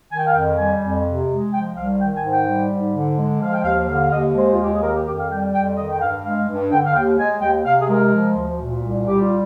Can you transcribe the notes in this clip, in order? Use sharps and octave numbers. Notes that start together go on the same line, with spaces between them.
D#3 G#5
G5
F5
F2 G5
G3 G#5
F2
C3
G#3
F3 G5
C2 F5
D#3 G5
G#5
G#2
G5
G3
G#2
D3
G#3
F3 F5
G5
D#2 F5
D3 F5
F5
D#2 D#5
G#3 C5
F4
D#2 G4
G#4
D#3 A#4
G4
F2 G4
F5
G3 G5
F2 G5
D#3 D#5
G5
G2 F5
G#3 F5
G2
D3 G5
F5
D#2 G5
G#3 G#5
D#2 G5
C3 F5
G#4
G#3 A#4
F3
D2
A#2
C2
G3 G4
F4